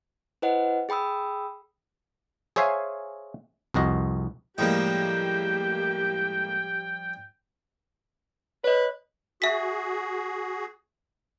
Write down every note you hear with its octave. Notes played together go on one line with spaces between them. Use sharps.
E4 B4 C5 D#5 F#5
G#4 G5 B5 D#6 E6
G#4 C5 C#5 E5 F5 G#5
C2 F2 F#4 D#5
A2 F3 G3 G#3 A#3 D#4 G4 G5
B4 C#5 D#5
F#4 G#4 E5 B6